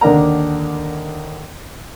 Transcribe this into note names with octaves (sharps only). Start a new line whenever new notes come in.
D#2 D3 D4 A#4 F#5 A#5